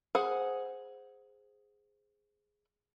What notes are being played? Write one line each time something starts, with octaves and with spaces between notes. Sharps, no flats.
G#4 C5 F#5